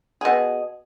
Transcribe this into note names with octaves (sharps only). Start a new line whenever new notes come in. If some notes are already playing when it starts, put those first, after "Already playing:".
B2 G#4